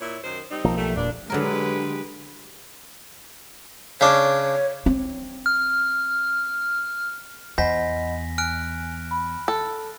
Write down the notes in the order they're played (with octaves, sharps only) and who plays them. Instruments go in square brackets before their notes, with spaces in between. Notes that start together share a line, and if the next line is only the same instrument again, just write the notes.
[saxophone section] A#2 E4 C#5
F#2 D#3 C5
G3 C4 D#4
[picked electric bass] B1 F3 A#3
[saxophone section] G3 A3
[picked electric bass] E1 A#2 [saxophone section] G2 D4
[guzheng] D3 F#3 A#4 [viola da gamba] G#3 G4 B4
[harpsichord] C#3 D4 [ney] C#5
[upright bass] C4
[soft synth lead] F6
[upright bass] E2 [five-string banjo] C5 [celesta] D#5 F#5 B5 [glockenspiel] G#5 A#6 B6
[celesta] G#5 [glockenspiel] F6 F#6 D7
[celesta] B5
[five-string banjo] A4